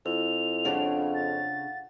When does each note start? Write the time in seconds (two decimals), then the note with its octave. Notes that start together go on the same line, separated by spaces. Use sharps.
0.06 F2 E4 F7
0.65 C#3 D4 F5 F#5
1.15 A6